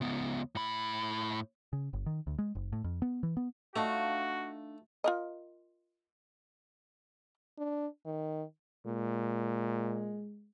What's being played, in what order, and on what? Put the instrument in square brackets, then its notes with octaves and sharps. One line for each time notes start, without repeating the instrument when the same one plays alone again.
[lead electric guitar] C#2 B3
A2 B5
[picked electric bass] C#3
G1
D#3
D2
G#3
F#1
A2
F2
B3
E3
B3
[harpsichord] A3 [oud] D4 D#4 F4 [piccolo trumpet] F#4
[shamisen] F4 A#4 D#5
[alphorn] D4
D#3
[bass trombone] A#2 [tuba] G#3